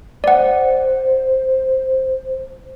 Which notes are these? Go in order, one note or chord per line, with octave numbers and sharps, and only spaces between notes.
C5 D5 F#5